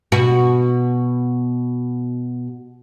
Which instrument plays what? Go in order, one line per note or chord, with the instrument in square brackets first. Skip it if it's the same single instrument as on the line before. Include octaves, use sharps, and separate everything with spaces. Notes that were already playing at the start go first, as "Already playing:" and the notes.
[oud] B2 F#4